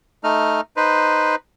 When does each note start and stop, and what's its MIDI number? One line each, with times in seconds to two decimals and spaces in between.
0.24 0.61 57
0.24 0.61 63
0.24 0.61 89
0.77 1.36 63
0.77 1.36 71
0.77 1.36 72